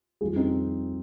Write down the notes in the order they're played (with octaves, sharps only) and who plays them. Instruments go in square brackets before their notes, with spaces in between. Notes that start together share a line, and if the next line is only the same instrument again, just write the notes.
[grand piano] F2 D#3 G3 F4 G#4
C4 D#4